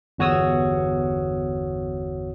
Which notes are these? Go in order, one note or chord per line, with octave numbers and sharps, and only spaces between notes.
G1 E2 F#4 C#5 D#6 E6